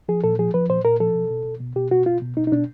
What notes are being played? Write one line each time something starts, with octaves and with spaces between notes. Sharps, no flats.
F3 G#4
A#2 A4
F3 G#4
F3 B4
A#2 C5
A#2 A#4
F3 A4
B2
B2
B2
B2
B2 G4
B2 F#4
B2 F4
B2
B2 D#4
D#4
B2 D4